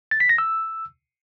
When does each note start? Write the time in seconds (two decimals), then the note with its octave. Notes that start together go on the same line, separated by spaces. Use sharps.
0.11 A6
0.20 B6
0.29 A#6
0.38 E6